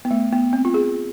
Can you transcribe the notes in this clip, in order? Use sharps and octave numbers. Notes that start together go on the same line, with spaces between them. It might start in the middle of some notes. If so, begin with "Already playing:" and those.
B3
A3
B3
C4
F4
G#4